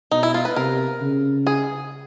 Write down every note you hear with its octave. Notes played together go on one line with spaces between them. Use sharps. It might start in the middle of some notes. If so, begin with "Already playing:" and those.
B2 D#4
E4
F4
B4
C3 A#4
C#3
G#4